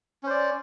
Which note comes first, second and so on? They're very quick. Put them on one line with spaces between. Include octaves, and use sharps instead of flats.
C#4 C5 D5